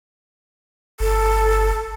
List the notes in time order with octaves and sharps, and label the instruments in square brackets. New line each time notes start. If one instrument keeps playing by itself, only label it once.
[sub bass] G1 [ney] A4